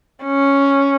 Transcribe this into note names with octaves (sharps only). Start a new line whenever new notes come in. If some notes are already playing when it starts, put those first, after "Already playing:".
C#4